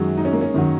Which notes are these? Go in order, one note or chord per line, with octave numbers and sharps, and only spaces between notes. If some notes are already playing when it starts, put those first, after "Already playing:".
Already playing: F#2 D#3 F#3 G#3
D#4
C#4
A#3
C#4
F#2 D#3 F#3